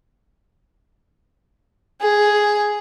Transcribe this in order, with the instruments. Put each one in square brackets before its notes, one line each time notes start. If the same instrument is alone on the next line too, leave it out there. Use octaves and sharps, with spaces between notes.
[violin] G#4